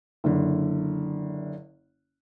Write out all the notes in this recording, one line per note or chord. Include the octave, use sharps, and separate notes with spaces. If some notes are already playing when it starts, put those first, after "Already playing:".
F#1 D3